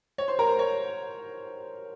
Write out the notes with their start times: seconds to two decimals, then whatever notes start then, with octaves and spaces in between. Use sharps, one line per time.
0.18 C#5
0.28 C5 C6
0.39 A#4 A#5
0.49 C5
0.59 C#5